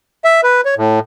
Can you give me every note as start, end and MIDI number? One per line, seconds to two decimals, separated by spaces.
0.24 0.41 76
0.43 0.61 71
0.65 0.74 73
0.77 0.99 45